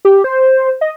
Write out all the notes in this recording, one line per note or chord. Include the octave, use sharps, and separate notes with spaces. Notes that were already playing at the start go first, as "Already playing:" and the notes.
G4
C5
D#5